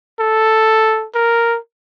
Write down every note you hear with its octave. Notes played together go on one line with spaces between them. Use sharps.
A4
A#4